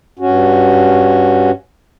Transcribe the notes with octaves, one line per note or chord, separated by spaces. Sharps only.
G2 C#4 F#4